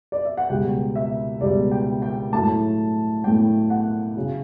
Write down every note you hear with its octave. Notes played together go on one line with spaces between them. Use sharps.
D5
E5
F#5
C#2 B2 G3 G5
E5
C#2 B2 G3 D5
G5
G5
A2 F#3 A3 A5
A2 F#3 A3 G5
F#5
C#3 F#3